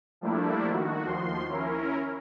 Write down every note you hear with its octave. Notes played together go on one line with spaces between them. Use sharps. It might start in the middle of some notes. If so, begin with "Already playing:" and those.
F3 G3 A3 A#3 D4 E4
D#3 F#4
D#2 F3 C6
C#4 E4 A#4